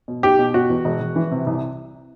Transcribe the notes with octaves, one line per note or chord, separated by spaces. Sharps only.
B2
B1 G4
B2
B2 F#4
E2
E1
E1
E3
C3
C2